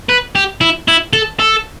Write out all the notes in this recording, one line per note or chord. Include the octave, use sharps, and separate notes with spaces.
B4
G4
E4
E4
A4
A4